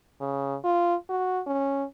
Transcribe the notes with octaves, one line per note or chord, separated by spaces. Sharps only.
C#3
F4
F#4
C#4